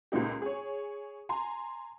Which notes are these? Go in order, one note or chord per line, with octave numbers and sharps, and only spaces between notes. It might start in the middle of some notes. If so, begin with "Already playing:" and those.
C#2 A#2 G#3 D#4 G4
G#4 C#5
G#5 A#5 C6